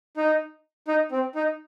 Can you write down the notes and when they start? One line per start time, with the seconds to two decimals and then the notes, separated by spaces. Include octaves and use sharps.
0.17 D#4
0.88 D#4
1.12 C4
1.35 D#4